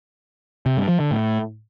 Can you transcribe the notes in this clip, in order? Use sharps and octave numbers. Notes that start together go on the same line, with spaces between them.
C3
G2
F3
D3
A2